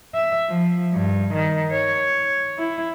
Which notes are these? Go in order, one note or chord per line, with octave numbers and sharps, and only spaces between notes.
E5
F3
G2
D#3
C#5
E4